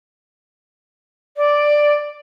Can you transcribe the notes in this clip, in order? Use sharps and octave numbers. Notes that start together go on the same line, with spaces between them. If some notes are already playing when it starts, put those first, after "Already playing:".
D5